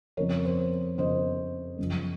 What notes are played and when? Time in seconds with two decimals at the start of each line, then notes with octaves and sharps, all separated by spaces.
0.17 F2 C#3 F3 A#4 C#5
0.45 C5
0.98 F2 C#3 F3 C5 D#5
1.78 F#2 C#3 F3